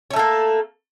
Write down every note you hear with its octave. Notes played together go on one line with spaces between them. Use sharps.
A3 A#3 A4 C#5